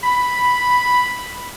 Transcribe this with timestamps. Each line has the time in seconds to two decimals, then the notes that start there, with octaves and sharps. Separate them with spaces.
0.04 B5